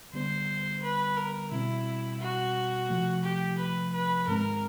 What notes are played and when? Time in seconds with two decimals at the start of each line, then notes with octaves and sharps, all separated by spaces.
0.13 D3 G3 B3 C5
0.82 B4
1.17 A#4
1.51 B2 G3 C4 E4
2.21 F#4
2.89 C3 F3 A3
3.24 G4
3.59 B4
3.93 B4
4.27 G#2 D#3 G#3 C4 A#4